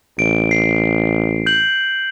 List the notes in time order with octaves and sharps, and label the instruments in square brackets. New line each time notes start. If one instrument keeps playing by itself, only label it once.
[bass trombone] A1 [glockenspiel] D7
[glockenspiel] C7
G6 F#7